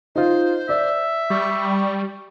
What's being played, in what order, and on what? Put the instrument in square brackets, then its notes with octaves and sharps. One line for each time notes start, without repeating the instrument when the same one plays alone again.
[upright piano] D#4 F4 [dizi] C5
[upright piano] D5 [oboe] E5
[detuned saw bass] G3 [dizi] C#6